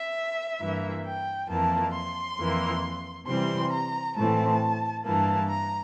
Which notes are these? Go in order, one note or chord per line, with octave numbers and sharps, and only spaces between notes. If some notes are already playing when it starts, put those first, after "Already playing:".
Already playing: E5
G2 E3 A#3
G5
F2 E3 A#3 A5
C6
F2 E3 A#3
C3 E3 G3 C4 C6
A#5
A2 E3 A3 C4 A5
G2 E3 A#3 A5
A#5